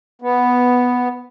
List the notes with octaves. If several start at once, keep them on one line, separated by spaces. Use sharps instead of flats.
B3